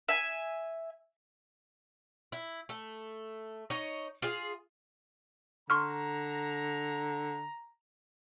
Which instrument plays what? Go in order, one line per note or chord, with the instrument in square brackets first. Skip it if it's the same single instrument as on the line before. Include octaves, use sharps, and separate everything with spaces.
[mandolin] E5 G#5
[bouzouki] E4
A3
D#4 C#5 D#5
F4 G#4
[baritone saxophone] D3 [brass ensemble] A#5 [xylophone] C6 C#6 F6